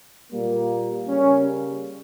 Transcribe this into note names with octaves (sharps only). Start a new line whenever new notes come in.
A#2 G3 A#3
C#3 G3 A#3 C#4